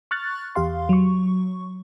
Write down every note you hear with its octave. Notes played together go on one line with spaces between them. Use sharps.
C#6 F6 F#6 A6
E2 G4 F5 C6
F#3 C#6